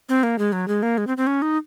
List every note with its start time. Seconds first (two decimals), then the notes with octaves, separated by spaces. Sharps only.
0.09 C4
0.23 A#3
0.39 G#3
0.52 F#3
0.68 G#3
0.83 A#3
0.98 G#3
1.07 C4
1.17 C4
1.27 C#4
1.42 D#4